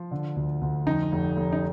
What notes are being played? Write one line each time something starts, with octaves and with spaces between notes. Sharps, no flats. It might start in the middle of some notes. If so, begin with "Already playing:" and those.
Already playing: F3 F4
D3
D2
D2
F2 D#4
F1
F1
D#4